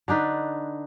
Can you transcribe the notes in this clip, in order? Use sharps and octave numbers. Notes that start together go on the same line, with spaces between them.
D3 D4 D#4 B4